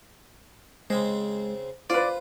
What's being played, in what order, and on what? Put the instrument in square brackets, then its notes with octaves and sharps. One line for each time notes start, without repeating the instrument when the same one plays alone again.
[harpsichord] C#3 C4 C5 [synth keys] G#3
[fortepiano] F4 B4 [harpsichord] C5 [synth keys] D5